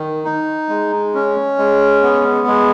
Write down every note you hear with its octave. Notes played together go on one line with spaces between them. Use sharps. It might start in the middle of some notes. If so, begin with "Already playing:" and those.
Already playing: D#3
D#4
G#3
C#4
G#3
B3
G#3